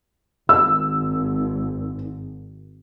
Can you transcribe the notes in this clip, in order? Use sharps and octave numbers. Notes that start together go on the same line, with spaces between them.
G#1 E6